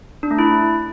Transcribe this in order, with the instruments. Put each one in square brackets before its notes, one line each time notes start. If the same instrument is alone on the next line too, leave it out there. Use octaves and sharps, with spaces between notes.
[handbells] D4
A3
E4